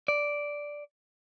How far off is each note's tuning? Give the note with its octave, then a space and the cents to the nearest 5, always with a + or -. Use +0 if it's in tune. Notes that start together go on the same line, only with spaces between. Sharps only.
D5 -5